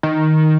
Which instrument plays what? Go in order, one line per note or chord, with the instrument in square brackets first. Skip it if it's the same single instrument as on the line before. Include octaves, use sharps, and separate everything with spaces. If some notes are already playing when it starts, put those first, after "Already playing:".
[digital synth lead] D#3